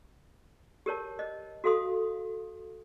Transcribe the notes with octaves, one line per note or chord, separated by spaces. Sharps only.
G4 A#4 C#5 A5
D#5
F#4 A4 F5 C6 D#6